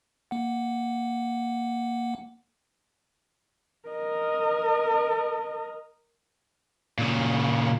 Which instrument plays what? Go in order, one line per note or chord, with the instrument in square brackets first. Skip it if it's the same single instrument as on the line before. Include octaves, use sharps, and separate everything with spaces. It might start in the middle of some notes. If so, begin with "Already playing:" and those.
[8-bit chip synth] A#3 F#5
[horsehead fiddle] A#4 D#5
[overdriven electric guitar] A#2 C#3